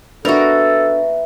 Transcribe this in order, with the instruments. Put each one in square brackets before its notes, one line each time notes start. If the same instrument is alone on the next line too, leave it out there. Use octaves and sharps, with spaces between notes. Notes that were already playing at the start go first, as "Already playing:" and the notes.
[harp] B3 E5 [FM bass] D4 [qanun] F#4 A#4 [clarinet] A4